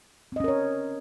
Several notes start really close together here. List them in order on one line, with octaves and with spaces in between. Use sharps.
C4 D#5 C#4 A#4 C#5